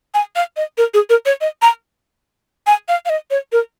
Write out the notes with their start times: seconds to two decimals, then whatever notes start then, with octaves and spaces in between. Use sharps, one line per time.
0.14 G#5
0.36 F5
0.57 D#5
0.78 A#4
0.94 G#4
1.10 A#4
1.26 C#5
1.41 D#5
1.62 A#5
2.67 G#5
2.88 F5
3.06 F5
3.10 D#5
3.31 C#5
3.52 A#4